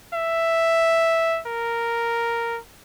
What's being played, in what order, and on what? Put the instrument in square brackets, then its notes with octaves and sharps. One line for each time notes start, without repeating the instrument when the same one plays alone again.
[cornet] E5
A#4